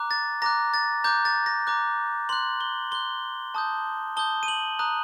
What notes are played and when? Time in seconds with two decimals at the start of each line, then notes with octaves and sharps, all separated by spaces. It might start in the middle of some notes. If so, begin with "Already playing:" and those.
Already playing: A#5 D6 F#6
0.11 A6
0.42 A#5 D6 F#6 A#6
0.74 A6
1.04 A#5 D6 F#6 G6
1.25 A6
1.46 A#6
1.67 A#5 D6 F#6
2.29 C6 F#6 F#7
2.61 G7
2.92 C6 F#6 G7
3.55 A5 D#6 G6
4.17 A5 D#6 G6 G7
4.43 D#7
4.48 F#7
4.79 A#5 D#6 F#6